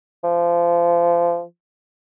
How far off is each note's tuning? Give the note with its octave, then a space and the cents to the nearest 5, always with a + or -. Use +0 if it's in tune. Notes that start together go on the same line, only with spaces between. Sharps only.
F3 -25